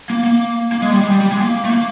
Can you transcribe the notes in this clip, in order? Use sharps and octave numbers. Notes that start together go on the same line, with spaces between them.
A#3
A#3
A#3
G#3
G3
G#3
G3
G3
G#3
A#3
A3
A#3